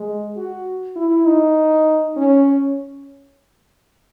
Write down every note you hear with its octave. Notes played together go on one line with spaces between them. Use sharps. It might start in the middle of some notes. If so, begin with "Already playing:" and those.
Already playing: G#3
F#4
E4
D#4
C#4